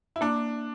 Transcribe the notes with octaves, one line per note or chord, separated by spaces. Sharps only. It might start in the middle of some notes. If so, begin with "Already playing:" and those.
E4
A#3 D4